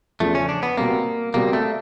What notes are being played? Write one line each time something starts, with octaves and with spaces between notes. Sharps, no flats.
E2 C#3 F3 A3
C#4
D4
B3
B2 G3 A#3 C4
B2 G3 A#3 C4
A3